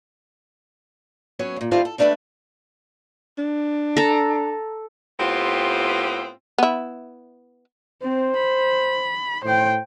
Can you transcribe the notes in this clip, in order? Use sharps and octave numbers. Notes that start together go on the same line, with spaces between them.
F#3 B3 C#4 C#5
D#2 A#2
D#3 F3 G3 A3 C4 F4
A4
G3 A3 D4 A4 B4 E5
D4
A4 A#5
A2 B3 C4 F4 G4
B3 E4
C4 C5
B5
A2 C5 G5